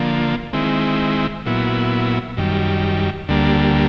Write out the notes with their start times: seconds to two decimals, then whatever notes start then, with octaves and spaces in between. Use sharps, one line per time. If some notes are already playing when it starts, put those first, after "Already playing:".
Already playing: D3 F3 A#3
0.53 D#3 G#3 C4 E4
1.46 A#2 F#3 B3 E4
2.37 F#2 D#3 G3
3.29 D2 D3 G3 A#3